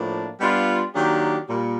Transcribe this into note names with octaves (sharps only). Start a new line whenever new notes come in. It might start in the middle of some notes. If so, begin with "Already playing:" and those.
Already playing: A2 F3 A#3 D4
G3 B3 D4 F4
D#3 F#3 A#3 D4 G4
A#2 G3